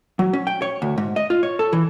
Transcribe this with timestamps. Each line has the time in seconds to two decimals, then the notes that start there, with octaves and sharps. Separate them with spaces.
0.19 F#3
0.33 C#4
0.47 G5
0.62 C#5
0.82 D2
0.98 G#2
1.16 D#5
1.30 F4
1.43 C#5
1.59 A4
1.73 E3